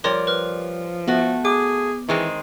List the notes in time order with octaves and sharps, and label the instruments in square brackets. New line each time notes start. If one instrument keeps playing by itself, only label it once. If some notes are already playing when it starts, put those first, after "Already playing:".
[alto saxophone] F3 [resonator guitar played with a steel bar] G3 A#4 D5 [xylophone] C#5 C6
[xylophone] B4 F6
[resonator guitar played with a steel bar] A3 F#4 [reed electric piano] B3
[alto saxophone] G#4 [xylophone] D6
[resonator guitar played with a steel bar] D#3 G#3 C4 [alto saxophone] E3